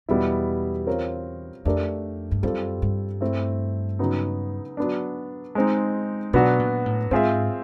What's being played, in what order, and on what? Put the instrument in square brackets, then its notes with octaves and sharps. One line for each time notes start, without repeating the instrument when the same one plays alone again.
[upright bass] E2 [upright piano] B2 G3 B3 E4
[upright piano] C4 F4 A#4 C#5
[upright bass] F2 [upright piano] A3 D4 G4 A#4 D5
[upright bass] G2
[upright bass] F#2 [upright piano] G3 C4 F4 A4
[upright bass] G2
[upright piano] A3 C4 E4
C#3 F#3 B3 D#4
F#3 B3 D4
G#3 C4 D#4
[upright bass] B2 [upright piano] F#3 B3 D4 F#4
[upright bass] A#2
A2
[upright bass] G#2 [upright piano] C4 F4 G#4 C5 E5